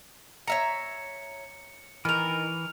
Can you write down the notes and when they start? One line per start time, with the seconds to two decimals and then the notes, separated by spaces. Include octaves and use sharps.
0.47 C#5 E5 A#5 C#7
2.05 D#3 E3 A#4 F6 F7